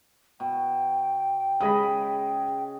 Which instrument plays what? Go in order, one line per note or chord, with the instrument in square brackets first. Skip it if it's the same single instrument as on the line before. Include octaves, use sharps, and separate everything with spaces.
[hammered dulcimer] B2 [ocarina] G5
[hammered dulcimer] C#3 D#5 B5 [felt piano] G#3 G#4 D#6